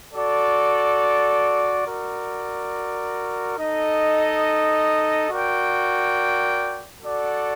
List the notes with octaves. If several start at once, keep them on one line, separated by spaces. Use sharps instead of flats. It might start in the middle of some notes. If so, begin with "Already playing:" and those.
F#4 A4 D5
F#4 A#4 D5
D#4 A4 D#5
F#4 A#4 D5 G5
F#4 A4 D5 F#5